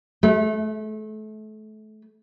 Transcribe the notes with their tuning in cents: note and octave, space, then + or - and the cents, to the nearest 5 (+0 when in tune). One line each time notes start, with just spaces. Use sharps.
A3 -30